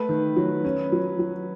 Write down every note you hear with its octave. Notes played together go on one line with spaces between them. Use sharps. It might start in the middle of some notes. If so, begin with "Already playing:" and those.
Already playing: A3 B4
D#3
F#3
C#4
F#3
F#3